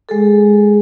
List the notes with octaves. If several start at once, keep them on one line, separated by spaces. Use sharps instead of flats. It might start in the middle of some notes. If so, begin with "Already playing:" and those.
G#3 G#4 A4